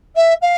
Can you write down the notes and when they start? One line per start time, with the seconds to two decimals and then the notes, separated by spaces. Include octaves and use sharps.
0.15 E5
0.41 F5